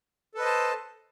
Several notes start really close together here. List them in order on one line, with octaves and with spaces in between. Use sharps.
A4 B4 D#5 C5 A5